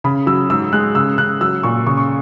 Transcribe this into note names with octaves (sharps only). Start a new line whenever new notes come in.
C#3 B5
F#3 E6
G#2 E6
G#3 F#6
C#3 E6
C#3 F#6
F#3 E6
A#2 C#6
C#3 C#6
C#6